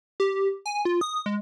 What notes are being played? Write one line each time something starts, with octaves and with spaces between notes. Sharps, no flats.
G4
G#5
F4
D#6
G#3